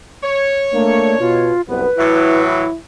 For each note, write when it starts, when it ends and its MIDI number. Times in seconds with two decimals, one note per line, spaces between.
0.23 1.55 73
0.73 1.15 57
0.73 1.17 58
0.73 1.17 62
1.20 1.52 47
1.20 1.62 65
1.69 1.87 36
1.69 1.87 42
1.69 1.87 59
1.69 2.42 71
1.98 2.66 45
1.98 2.66 52
1.98 2.66 54
1.98 2.76 64